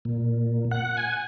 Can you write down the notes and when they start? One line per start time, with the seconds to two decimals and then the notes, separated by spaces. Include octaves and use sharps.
0.05 A#2
0.71 F#5
0.97 G#5